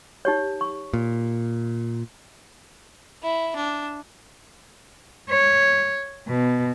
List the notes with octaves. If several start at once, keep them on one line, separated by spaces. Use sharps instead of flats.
D#4 G4 C#5
C#6
A#2
E4
D4
C#5
B2